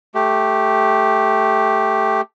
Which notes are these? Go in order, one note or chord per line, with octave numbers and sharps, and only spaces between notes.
A3 G4